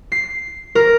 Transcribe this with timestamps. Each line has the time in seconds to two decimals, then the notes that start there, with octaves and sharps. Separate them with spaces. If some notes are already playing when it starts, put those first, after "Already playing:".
0.12 C7
0.75 A#4